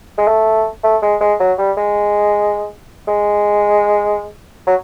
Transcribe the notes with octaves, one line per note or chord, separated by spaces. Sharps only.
G#3
A3
A3
G#3
G#3
F#3
G3
G#3
G#3
F#3